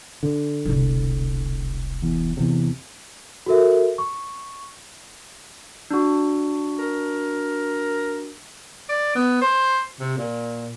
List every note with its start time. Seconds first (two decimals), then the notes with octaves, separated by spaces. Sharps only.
0.23 D3
0.66 E1 C2
2.02 E2
2.37 E2 C3
3.46 F#4 A4 A#4 E5
3.98 C#6
5.91 D4 F#4
6.79 A#4
8.89 D5
9.15 B3
9.42 C5
10.00 C3
10.17 A#2